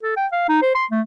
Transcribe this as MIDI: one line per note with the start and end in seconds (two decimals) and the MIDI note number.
0.03 0.16 69
0.17 0.27 79
0.32 0.47 77
0.49 0.61 63
0.62 0.73 72
0.75 0.85 84
0.91 1.01 57